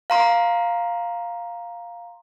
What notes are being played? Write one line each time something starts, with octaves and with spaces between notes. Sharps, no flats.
F5 A#5 C6